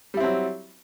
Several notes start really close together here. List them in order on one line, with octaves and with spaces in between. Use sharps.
G3 E4 C4 F#3